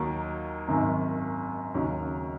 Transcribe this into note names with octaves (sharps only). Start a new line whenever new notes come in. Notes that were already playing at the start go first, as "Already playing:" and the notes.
Already playing: D#2 D#3 F#3 A#3
G#1 F#2 D#3
D#2 C#3 F#3 C#4